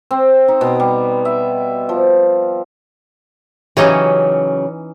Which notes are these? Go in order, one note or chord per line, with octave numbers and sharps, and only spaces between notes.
C4
D#4
B2
G3
E5
F3
C#3 E3 F#3 C#4 D#4 G4